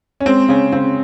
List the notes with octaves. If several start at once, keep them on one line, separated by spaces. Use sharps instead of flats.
C#4
G#3 C4
C#3 C#4
C#3 C4